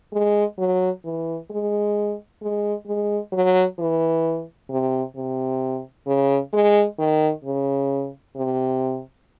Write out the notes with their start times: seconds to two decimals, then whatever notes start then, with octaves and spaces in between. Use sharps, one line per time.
0.13 G#3
0.58 F#3
1.05 E3
1.50 G#3
2.42 G#3
2.87 G#3
3.32 F#3
3.79 E3
4.70 C3
5.16 C3
6.07 C#3
6.53 G#3
6.99 D#3
7.45 C#3
8.36 C3